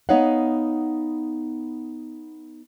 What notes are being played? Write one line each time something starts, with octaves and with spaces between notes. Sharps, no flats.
B3 D#4 C#5 F5 F#5